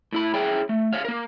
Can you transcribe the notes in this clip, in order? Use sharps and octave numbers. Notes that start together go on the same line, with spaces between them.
A2 E4 B5
E4 G#4 C#5 G5
A3
C5 C#5 F5
A#3 A#4